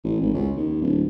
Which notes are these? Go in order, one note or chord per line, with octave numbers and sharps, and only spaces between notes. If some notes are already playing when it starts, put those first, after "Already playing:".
A1
G#1
C#2
D#2
D1